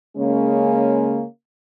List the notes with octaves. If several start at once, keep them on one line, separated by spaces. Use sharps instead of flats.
C#3 G#3 A#3 C#4